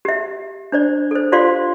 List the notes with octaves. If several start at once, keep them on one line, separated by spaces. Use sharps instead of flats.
G4 E5
D4 C5 D5
A4 C5
F4 G4 C5 D5 F5 C6